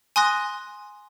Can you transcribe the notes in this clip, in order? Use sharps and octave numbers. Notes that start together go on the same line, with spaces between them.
G#5 C6 D#6 F#6 A#6